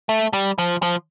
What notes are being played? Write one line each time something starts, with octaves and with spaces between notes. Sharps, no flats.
A3
G3
F3
F3